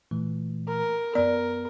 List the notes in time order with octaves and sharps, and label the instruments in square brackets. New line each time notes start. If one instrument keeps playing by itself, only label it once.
[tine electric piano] A#2 E3 A3
[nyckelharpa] A#4
[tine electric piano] F#2 B3 [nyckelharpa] A#4 [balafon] D5